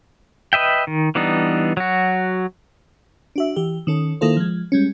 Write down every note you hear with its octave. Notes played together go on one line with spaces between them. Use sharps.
B4 D#5 E5 G5
D#3
E3 G3 B3 D4 D#4
F#3 F#4
D4 F#4 E5
E3 G4
D#3 C#4 A4
D#3 A#3 E4 F4 A4 C5
F3 G#3
G3 G#3 C#4